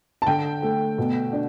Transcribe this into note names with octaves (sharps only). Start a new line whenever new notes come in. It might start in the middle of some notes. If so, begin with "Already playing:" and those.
A5
D3 G5
A3
B2
D4